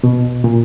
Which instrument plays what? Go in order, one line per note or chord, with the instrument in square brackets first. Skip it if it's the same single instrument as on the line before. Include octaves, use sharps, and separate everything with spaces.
[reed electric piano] B2
A#2